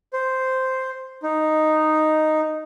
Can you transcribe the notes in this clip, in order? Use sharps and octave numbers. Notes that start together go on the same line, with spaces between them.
C5
D#4